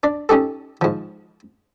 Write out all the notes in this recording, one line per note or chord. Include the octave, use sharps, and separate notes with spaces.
D4 D5
C#4 D#4 G4 A4
G#2 F3